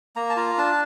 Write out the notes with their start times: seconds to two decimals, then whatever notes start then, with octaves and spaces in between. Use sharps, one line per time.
0.16 A#3 A#5
0.30 A5
0.36 F4 A#5
0.58 D4 A5